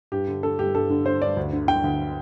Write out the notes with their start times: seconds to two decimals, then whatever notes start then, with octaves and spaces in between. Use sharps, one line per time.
0.12 G2 G4
0.28 D3
0.43 D3 A4
0.59 G2 G4
0.75 G2 A4
0.90 D3
1.05 D3 C5
1.21 G2 D5
1.37 D2
1.53 D3
1.68 D3 G5
1.84 D2